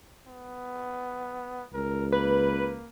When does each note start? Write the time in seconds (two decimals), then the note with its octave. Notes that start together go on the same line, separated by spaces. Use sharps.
0.27 B3
1.74 C#2 A#4
2.12 A#3 B4